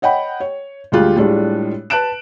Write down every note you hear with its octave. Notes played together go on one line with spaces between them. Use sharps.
C#5 D#5 F#5 G5 B5
C#5
D2 G3 G#3 F4 G4 F#6
A2 G3 G#3 D4 F4
B4 A5 F#6 D7 E7